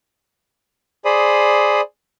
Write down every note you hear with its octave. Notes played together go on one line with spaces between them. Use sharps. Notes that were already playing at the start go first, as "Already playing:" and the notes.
G#4 C5 D5 B5 D#6